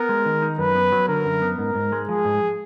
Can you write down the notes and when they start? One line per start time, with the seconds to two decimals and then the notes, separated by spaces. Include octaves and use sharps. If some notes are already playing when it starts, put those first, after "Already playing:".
Already playing: B3 A#4
0.09 G#3
0.26 D#3
0.42 D#4
0.58 F#2 B4
0.75 B3
0.92 F#3
1.08 D3 A#4
1.25 F#2
1.42 B3
1.58 G#2 A#4
1.75 G#2
1.92 G#3
2.09 F3 G#4
2.25 G#2